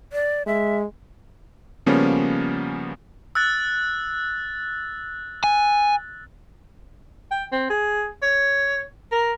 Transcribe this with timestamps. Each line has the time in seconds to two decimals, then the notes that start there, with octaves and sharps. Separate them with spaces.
0.13 D5
0.47 G#3 E5
1.86 C#3 F3 G3 A#3 B3 C#4
3.35 E6 F#6 A6
5.44 G#5
7.31 G5
7.52 C4
7.70 G#4
8.23 C#5
9.12 A#4